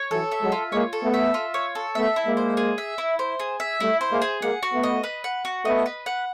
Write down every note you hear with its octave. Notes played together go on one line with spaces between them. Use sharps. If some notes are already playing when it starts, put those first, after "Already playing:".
Already playing: C#5
E3 F#3 A4
E5
F#3 G#3
F4
G#3 A#3 C#5
A4
A3 B3
E5
F4
C#5
A4
A3 B3 E5
E4
G#3 A#3
C5
G#4
E5
E4
C5
G#4
E5
G3 A3 E4
C5
G#3 A#3
G#4
G#3 A#3 F#5
F#4
A3 B3
D#5
B4
F#5
F#4
A3 B3 D#5
B4
F#5